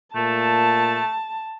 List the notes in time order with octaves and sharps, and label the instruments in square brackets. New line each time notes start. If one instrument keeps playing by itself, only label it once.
[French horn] A#2 [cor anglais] A3 [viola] A5